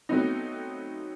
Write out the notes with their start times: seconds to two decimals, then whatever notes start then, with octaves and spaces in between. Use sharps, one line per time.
0.09 F#3 A3 B3 C4 D#4